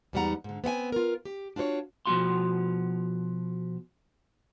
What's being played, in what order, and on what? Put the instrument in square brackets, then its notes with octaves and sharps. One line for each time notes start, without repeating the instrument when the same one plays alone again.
[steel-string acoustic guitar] E2 G#2 G3 D#4 F#5 A#5
G#2 D3
B3 C4 F#5 G#5
F4 A#4
G4
D4 F4 F#4 C5 C#5
[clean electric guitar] B2 F3 A3 F#4 F5 C6